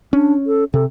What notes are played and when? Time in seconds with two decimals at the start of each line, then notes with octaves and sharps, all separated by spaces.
0.13 C#4 D4
0.47 A4
0.74 C3 A4